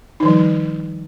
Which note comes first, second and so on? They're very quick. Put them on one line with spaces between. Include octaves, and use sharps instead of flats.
D#4 D#3 F3 G3